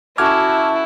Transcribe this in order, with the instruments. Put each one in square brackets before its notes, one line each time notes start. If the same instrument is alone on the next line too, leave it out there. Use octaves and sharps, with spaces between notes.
[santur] C#4 F#4 A4 [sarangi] E4 [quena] A5 [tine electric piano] D6 F6 G#6